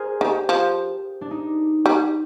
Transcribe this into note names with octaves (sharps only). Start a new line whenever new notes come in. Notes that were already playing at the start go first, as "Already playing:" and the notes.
Already playing: G#4 A#4 C5 D5
D#3 G4
F3
D4
D#4
G3